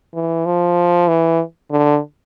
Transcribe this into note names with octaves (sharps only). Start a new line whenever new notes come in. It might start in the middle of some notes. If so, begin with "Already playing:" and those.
E3
F3
E3
D3